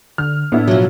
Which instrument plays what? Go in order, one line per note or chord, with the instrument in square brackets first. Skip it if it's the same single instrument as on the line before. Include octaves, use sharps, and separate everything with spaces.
[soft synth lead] D3 [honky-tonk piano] F6
[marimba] A2 [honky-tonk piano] B3 E4 [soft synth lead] D4
[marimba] B2 F#4 [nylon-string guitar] F3 F#3